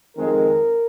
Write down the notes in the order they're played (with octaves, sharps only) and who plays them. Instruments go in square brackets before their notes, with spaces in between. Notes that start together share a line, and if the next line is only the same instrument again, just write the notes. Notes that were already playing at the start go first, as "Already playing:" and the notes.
[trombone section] F2 D#3 G#3 C4 A#4